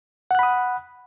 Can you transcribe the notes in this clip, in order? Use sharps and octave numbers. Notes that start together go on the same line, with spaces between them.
F#5 B5 D#6 F#6